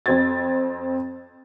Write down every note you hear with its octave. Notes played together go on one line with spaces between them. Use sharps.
F2 C4 G#6 A6